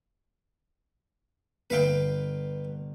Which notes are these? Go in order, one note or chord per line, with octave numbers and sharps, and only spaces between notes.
G1 B4 F5 G5 D7